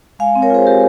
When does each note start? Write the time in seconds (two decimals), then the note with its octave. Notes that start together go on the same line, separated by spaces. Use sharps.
0.19 G#3 F5 G#5
0.35 C4
0.42 A#4 C#5
0.50 F4 G#4 C5
0.66 G#3 G4 A#4